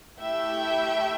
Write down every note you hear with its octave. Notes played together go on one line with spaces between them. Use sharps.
A3 E4 G4 E5 G5